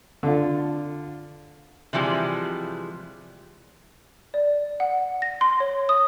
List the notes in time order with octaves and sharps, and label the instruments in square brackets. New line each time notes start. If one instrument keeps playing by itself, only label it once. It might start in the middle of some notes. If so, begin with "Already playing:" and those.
[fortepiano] D3 F4
[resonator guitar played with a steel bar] C3 E3 F3 G3 G#3
[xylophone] D5
F#5
A#6
C6
C#5
D#6